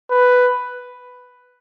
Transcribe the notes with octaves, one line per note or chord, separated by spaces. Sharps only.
B4